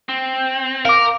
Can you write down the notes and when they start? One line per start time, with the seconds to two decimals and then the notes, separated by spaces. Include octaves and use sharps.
0.09 C4
0.85 A#4 F5 D6